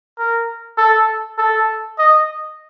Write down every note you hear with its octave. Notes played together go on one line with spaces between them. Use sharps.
A#4
A4
A4
D#5